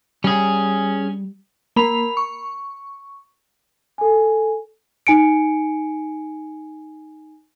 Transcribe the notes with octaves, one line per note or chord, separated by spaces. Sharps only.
G3 C#4 G#4
A#3 B5 F7
C#6
A4 G#5
D#4 G#5 C#7 D7